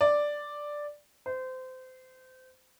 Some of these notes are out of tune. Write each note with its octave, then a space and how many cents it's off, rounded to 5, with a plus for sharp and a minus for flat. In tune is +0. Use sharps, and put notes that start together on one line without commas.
D5 +0
C5 -25